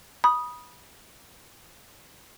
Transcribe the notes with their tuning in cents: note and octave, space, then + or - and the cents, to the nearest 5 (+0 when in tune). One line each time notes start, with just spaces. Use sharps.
B5 -25 D#6 +0